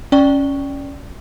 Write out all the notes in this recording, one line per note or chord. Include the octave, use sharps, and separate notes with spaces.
C#4 D5 G5 C#6 G7